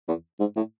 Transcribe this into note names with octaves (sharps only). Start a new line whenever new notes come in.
E2
G#2
A2